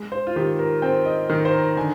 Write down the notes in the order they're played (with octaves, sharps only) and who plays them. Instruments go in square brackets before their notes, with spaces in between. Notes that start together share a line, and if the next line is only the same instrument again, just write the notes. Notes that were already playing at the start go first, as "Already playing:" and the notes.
Already playing: [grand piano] G#3
[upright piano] C5
F4
[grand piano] D#3 [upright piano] G4
[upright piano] A#4
[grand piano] C4 [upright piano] G5
[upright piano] D#5
[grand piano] D#3
[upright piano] C5
A#4
[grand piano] D3 [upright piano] G#5